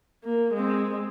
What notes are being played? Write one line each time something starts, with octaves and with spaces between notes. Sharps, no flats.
A#3
G#3 C4